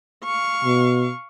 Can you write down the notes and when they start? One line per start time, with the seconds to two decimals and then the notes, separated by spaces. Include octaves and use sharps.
0.24 F5 C#6
0.65 B2